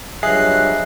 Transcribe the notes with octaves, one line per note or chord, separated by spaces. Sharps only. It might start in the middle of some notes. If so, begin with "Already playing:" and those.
G2 F3 F#3 G#4 D#5 E5 F#6 C7